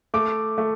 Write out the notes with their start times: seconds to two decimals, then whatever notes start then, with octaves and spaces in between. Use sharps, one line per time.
0.14 A3 D6
0.58 A3